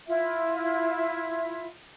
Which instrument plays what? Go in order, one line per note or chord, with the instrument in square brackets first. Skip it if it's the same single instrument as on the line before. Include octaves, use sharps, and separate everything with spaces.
[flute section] E4 F4 E5